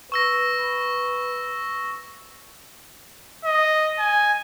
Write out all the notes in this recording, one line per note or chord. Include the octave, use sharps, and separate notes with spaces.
B4 C#6 E6 A#6
D#5
G#5